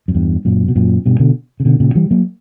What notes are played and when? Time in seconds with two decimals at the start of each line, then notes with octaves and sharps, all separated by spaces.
0.08 F#2
0.15 E2 G2
0.45 F#2 A#2
0.68 B2
0.75 F#2 A#2
1.06 G2 B2
1.20 B2 D3
1.60 C#3
1.65 B2 D3
1.80 A#2 C#3
1.95 E3 G3
2.11 F#3 A#3